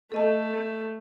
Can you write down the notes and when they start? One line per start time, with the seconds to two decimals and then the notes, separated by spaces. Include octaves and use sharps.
0.12 A3 A4 D#5 A5